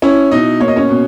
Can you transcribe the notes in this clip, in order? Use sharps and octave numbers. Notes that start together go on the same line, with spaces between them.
C#4 E4 C#5
B2 D#4 D#5
A#3 C#5
D#5
C#4 C#5
B2